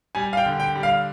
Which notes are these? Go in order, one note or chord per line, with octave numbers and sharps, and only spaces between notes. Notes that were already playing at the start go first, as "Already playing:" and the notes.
G3 G#5
F5
G5
D3
G5
G3
F5